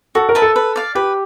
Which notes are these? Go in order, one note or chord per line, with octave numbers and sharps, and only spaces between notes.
F#4 A4
A#4
B4 E5 A5
A4
B4
D5 F5
G4 B4